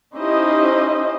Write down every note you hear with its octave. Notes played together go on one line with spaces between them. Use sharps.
C#4 D#4 E4 G4 C5 D#5